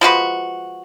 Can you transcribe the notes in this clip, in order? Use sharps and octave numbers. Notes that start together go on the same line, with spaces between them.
F3 G#3 F#4 B4